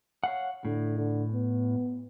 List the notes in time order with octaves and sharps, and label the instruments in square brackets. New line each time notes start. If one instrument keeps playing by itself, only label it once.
[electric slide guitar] C#5 F5 F#5
[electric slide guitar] A2 [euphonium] D3
[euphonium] D3
B3